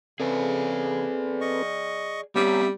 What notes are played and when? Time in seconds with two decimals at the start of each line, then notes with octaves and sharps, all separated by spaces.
0.20 C#3 C4 G#4 A4 B4 D5 G#5
1.41 D#5 C#6
2.36 G3 B3 C4 C#5 E5 G#5 A#5